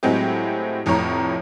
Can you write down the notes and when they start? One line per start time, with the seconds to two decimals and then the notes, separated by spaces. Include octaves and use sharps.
0.03 A2 F#3 G#3 C4 G4
0.86 F1 F2 A2 C#5 A#5